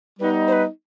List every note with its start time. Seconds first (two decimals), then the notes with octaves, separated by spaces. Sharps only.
0.19 G3 B3 D#4 B4
0.48 C5
0.52 B4